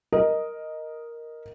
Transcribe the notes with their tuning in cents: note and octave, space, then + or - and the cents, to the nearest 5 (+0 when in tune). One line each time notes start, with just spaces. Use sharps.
A#4 +0 D#5 +0